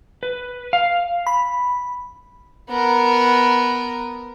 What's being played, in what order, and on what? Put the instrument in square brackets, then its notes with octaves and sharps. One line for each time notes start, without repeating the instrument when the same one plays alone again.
[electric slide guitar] B4
F5
[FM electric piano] B5
[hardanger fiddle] B3 A#4